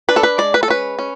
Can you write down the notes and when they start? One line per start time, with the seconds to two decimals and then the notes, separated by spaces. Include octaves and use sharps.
0.09 D4 B4
0.16 A4
0.23 B4
0.38 G#3 D5
0.54 B4
0.63 A4
0.68 C#4 B4
0.99 C#4